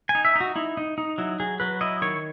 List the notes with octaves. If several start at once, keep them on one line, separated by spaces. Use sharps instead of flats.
G#5
D#4
E5
D#4 F#4
D#4 E4
D#4
D#4
F#3 E4
F#3 G#4
F#3 B4
E4 D#5
D#3 C#5